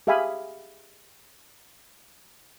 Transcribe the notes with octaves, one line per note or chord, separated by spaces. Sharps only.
G4 G#4 E5 F5 G#5 B5